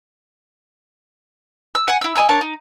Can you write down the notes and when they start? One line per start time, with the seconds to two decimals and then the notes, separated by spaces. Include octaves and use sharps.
1.75 E6
1.88 F#5 G#5
2.01 E4 E6
2.15 D#5 G#5 A#5 E6
2.29 D4 A#4 C#5 A5
2.41 D#4